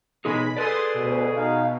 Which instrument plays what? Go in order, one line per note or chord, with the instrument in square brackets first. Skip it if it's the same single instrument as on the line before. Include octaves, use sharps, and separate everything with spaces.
[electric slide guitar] B2 D#4 G#4 [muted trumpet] G#3 [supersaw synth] B5
[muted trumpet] G#4 [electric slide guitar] A4 B4 D5 [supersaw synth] C6 D#6 A6
[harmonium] D2 [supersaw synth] B2
[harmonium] D#4 F5